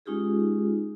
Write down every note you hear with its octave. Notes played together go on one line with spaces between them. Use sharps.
G#3 C#4 D#4 F4 G4 G#4